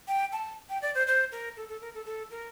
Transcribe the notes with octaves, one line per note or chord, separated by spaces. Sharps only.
G5
A5
G5
D5
C5
C5
A#4
A4
A4
A#4
A4
A4
A#4